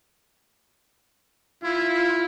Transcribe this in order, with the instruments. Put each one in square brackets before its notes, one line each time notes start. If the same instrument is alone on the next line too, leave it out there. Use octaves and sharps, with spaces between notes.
[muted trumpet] E4 [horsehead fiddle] F4